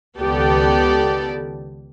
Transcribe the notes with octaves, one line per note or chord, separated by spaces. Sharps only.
C#2 D#3 B3 G4 A4 D5